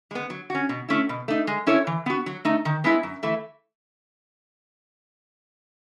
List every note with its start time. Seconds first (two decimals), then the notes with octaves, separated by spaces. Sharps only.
0.11 G#3 B3
0.30 F#3
0.50 C#4 F#4
0.69 B2
0.89 A3 C#4 E4
1.09 B2
1.28 A3 D#4
1.47 G#3
1.67 C#4 E4 A4 C#5
1.87 E3
2.06 B3 F#4
2.26 F#3
2.45 A3 D#4
2.65 D#3
2.84 G#3 B3 E4
3.03 F#2
3.23 E3 A3